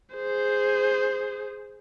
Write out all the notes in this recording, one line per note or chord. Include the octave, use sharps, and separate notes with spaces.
G#4 C5